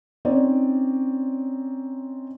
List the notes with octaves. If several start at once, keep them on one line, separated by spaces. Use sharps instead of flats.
C4 C#4 D#4 C#5 D5